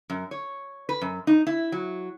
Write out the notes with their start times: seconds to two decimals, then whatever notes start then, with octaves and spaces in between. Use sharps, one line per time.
0.10 F#2
0.31 C#5
0.89 B4
1.01 F#2
1.27 D#4
1.47 E4
1.72 F#3